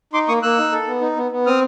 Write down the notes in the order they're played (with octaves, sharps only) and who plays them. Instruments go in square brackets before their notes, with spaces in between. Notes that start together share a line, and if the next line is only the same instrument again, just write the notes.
[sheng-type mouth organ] D#4 C6 D6
A#3 C#6 D#6
A#3 E6 F#6
D#4
A4
B3
D#4
B3
B3
C4 D#6 F6